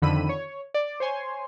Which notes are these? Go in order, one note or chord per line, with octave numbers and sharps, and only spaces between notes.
F2 D3 D#3 B5 E6 D#7
C#5
D5
C5 C#5 G#5 C6